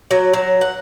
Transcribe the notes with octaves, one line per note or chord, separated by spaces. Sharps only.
F#3
F#3
F#5